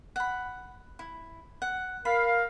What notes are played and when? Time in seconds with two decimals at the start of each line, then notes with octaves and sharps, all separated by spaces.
0.16 F#5 B5
0.99 E4
1.62 F#5
2.05 A#4 F5 B5